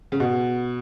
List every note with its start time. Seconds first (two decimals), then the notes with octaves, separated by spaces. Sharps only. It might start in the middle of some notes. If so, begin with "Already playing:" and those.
0.12 C#3
0.20 B2